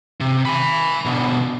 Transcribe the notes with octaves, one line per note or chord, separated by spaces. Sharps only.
C3
G#5 B5
B2 D3